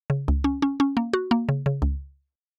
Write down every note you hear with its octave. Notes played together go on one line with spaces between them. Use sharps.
C#3
C#2
C#4
C#4
C#4
A#3
F#4
A#3
C#3
C#3
C#2